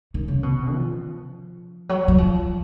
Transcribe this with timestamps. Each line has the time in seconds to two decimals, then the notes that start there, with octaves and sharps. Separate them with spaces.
0.14 D#3
0.28 C#3
0.43 B2
0.73 F3
1.89 F#3
2.08 F#3
2.18 F3